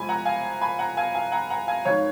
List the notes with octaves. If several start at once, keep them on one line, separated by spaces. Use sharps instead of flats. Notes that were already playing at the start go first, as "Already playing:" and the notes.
Already playing: F2 F3 G#3 G#5 B5
F#5 A#5
F5 G#5
G#5 B5
F#5 A#5
F5 G#5
F5 G#5
F#5 A#5
F#5 A#5
F5 G#5
G#1 D#3 C#5 F5